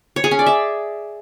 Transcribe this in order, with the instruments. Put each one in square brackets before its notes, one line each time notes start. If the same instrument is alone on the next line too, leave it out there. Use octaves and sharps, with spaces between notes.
[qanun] C#5
G#4
C#4
D5
E5